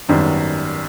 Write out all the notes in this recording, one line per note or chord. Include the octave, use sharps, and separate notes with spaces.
G#1 F#2 D#3 G3 B3